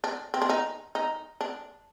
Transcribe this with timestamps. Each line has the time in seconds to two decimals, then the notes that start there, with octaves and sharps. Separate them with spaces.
0.04 D4
0.34 C4
0.42 D4
0.49 D#4
0.95 D#4
1.41 D4